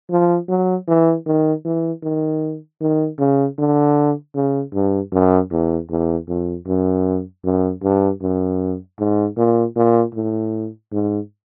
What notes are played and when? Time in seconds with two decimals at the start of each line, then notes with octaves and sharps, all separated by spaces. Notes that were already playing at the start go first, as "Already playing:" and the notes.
0.10 F3
0.49 F#3
0.88 E3
1.26 D#3
1.65 E3
2.03 D#3
2.81 D#3
3.19 C#3
3.58 D3
4.35 C#3
4.74 G2
5.12 F#2
5.51 E2
5.90 E2
6.28 F2
6.67 F#2
7.44 F#2
7.83 G2
8.22 F#2
8.99 G#2
9.37 A#2
9.76 A#2
10.15 A2
10.92 G#2